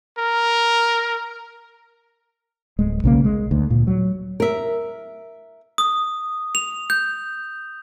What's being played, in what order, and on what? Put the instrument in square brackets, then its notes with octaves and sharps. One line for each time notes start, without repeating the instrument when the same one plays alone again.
[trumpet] A#4
[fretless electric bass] D1 G#3
B1 C#3 A#3
G#3
D2
A#2
F#3
[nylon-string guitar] A#4 E5
[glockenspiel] D#6
F7
G6